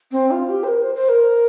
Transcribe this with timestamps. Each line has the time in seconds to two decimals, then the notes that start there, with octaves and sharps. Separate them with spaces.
0.12 C4
0.31 F4
0.49 G4
0.64 C5
0.68 A#4
0.82 C5
0.95 C5
1.09 A#4